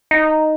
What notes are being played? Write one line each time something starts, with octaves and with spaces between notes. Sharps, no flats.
D#4